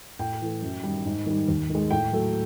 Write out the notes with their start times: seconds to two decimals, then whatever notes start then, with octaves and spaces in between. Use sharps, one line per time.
0.19 A2 G5
0.42 E3 A3
0.62 F#2
0.83 D#3 G3
1.05 G#2
1.26 D#3 G3
1.48 D#2
1.69 D#3
1.75 G#3
1.91 A2 G5
2.13 F#3 A3